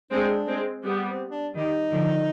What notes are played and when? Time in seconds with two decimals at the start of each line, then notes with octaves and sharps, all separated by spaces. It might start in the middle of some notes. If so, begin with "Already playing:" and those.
0.11 G#3 C4 D4
0.47 G#3 C4
0.83 G3 B3
1.06 C4
1.31 D4
1.54 D#3 G3 D#4
1.90 D3 F3